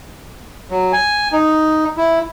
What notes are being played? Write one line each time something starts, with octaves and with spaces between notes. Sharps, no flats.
F#3
G#5
D#4
E4